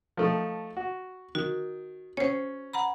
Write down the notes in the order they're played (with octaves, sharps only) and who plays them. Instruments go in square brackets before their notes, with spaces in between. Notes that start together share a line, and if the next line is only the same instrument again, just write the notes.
[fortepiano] F3 A3 D#4
F#4
[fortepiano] D#3 [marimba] F#4
[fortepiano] C#4 [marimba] C5 C#5
[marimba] F#5 A#5 B5